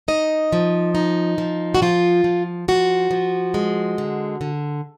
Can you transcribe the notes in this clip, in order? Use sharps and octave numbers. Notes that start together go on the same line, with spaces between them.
D#4 D#5
F3
D#4
F3
F#4
F3 F4
F3
F3 F#4
F3
G#3
D3
D3